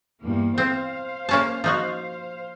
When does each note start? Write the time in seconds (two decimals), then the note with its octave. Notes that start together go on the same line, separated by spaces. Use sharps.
0.22 E2 G2 A#3
0.58 C4 C5 F5
1.29 A#3 C#4 A5
1.64 F3 D#4 F#4